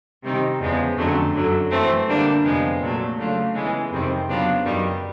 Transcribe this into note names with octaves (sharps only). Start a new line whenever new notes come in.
C3 D#3 G3 C4 D#4
E2 C#3 F3 G#3 B3
F2 D3 F#3 A3 C#4
F#2 D3 F#3
E3 A3 C4
D3 G3 A#3 D4
F2 C3 F3 G#3 B3
A#2 F#3 A3
C#3 F#3 A3 D4 F4
C#3 E3 G#3 B3
F2 C3 D#3 G3 C4
C#3 F#3 B3 D4 F4
F#2 D#3 G3